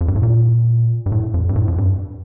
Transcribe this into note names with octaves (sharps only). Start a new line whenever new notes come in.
F2
G2
A2
A#2
G2
A2
F2
G2
A2
F2
G2